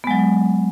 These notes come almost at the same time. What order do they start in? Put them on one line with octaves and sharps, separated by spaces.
B3 G#3 F#3